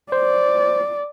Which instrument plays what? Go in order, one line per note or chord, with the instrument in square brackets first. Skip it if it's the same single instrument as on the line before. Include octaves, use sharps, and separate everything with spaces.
[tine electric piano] C5 [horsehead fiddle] D5